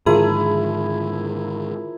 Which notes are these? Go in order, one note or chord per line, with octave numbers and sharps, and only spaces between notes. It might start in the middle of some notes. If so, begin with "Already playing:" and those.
G#2 D3 D#3 F3 A#3 E4 G#4